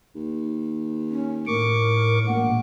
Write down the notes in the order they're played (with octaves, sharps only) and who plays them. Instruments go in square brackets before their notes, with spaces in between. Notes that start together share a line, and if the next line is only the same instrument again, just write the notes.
[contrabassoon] D#2
[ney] C#4
[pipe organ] A2 C#6 D6 [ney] A#4
[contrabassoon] E1 [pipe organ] A#2 [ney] F#5